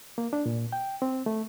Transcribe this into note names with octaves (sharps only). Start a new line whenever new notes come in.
A#3
D4
A#2
G5
C4
A3